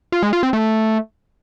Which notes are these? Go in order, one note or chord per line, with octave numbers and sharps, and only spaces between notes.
F4
G#3
F4
C4
A3